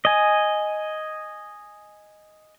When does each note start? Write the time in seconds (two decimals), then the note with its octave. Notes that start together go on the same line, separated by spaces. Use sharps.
0.05 D#5 G#5